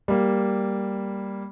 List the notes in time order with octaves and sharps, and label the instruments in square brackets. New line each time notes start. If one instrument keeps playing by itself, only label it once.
[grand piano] G3 A#3